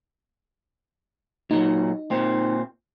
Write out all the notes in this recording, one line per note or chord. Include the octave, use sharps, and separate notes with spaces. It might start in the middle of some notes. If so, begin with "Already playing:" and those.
A#2 F#3 D#4
A#2 C4